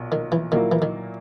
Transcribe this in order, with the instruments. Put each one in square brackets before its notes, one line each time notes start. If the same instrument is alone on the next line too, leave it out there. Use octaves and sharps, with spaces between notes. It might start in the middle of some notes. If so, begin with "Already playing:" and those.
Already playing: [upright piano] B1 A#2
[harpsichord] D#3
E3
[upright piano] A#2 F#3 A#3 E4 [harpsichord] D#3
[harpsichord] E3
D#3